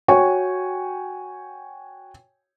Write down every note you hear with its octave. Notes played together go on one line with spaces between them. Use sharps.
F#4 C#5 G5 G#5 C#6